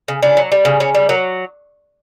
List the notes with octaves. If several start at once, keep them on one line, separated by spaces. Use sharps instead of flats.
C#3
C#3 D4
F#3
G3
C#3
C#3 C#4
G3
F#3 A#3